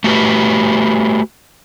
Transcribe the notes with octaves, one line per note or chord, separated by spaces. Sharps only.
A3 F#4 G4 B4